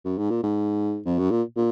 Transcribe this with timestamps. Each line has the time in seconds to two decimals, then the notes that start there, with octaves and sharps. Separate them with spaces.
0.05 F#2
0.18 G#2
0.30 A#2
0.43 G#2
1.06 F2
1.18 F#2
1.31 A#2
1.57 A#2